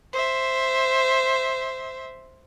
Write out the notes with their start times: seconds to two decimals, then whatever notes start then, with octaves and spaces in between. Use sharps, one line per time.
0.13 C5 E5